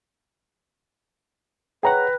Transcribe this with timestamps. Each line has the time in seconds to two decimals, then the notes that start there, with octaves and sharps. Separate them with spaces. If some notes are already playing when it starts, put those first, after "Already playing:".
1.83 G#4 B4 C#5 F#5 G5 A#5